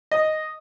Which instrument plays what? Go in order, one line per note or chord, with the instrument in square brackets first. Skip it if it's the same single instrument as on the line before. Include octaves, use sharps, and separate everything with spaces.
[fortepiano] D#5